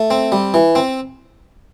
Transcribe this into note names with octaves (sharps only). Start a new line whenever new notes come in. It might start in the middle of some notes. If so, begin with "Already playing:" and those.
Already playing: A3
C4
G3
E3
C4